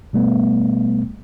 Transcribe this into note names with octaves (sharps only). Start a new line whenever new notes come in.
B2 G3 A3 B3